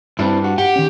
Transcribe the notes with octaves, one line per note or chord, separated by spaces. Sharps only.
G2 C4 D4 E4
F#4
G4 F#5
D#3 C#4